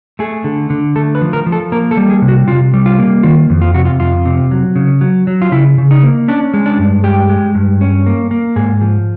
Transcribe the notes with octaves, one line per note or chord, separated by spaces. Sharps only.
A3 G#4
D3
D3
A3 A4
B4
F3
A#4
F3
A4
A#3 A#4
A4
G3
G#4
C3
F#4
C3 F4
G3
F4
A#3
D#3 F4
F2
F4
C3 F#4
F4
F2 F4
C3
F#3
C#3
F#3
F#3
F4
C#3 E4
C#3
D#4
A#3
C#4 D4
G#3
D4
G2
G#3 G4
G#3
G2
C#4
A#3
A#3
G#2 G#4
F3